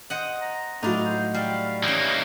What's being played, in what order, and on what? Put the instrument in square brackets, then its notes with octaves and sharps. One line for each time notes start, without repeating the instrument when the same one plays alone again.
[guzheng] C5 D#5 F#5
[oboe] A#5
[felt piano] A2 F#3 [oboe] D4 [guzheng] D#4 F5
[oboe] C5
[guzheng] G3 [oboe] F5
[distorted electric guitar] E3 A#3 [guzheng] C#4 G#4 [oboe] D#4